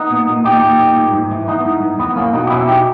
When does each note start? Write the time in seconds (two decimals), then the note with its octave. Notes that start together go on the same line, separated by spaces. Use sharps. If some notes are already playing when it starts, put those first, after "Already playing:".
Already playing: B3 D#4
0.10 A#2
0.28 A#2
0.44 A#2 D#4 G4
0.62 A#2
0.79 A#2
0.97 G#2
1.14 G#2
1.31 E3
1.48 E3 B3 D#4
1.65 G#2
1.82 G#2
1.99 E2 B3
2.16 E2 A#3 C#4
2.33 B2 B3 D#4
2.47 G4
2.50 B2 C#4 E4
2.67 D#4 G4